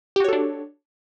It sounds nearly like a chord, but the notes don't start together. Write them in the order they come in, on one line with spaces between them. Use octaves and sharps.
G4 F#4 C#5 A4 D4